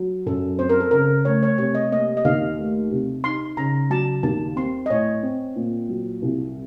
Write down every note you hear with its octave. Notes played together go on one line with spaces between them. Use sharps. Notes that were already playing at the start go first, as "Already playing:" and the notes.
Already playing: F#3
F#2 A4
C4 C5
A#4
A4
C#3 A#4
A3 C#5
C#5
C3 C#5
D#5
A#3 D#5
D#5
D#2 F5
A3
C3
D#4 C6
C#3 A#5
F#3 A5
D#2 A5
C4 C6
D#5
A2 C#5
C4
A#2
F#3
C2